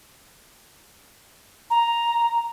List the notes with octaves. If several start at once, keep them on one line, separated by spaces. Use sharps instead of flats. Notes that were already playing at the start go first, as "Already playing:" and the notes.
A#5